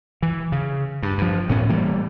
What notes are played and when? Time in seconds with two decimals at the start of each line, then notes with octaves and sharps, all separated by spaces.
0.23 E3
0.52 C#3
1.03 G2
1.18 G2 F3
1.48 D2 A2 B3 C#4
1.69 E3 G3 A3 A#3